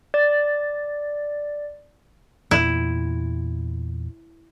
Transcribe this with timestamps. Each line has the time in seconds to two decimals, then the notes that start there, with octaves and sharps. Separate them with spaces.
0.14 D5 A6
2.51 E2 A#2 E4